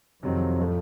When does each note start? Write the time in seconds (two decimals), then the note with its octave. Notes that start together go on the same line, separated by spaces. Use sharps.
0.23 F2 C3 D#3 F#3 C4
0.60 A2 F3 A3